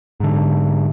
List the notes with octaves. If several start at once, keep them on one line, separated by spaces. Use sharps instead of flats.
G#2 D3